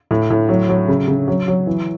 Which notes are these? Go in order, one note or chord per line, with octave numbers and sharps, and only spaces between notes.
A2
A2
F#3
F#3
C#3
C#3
F#3
F#3
E3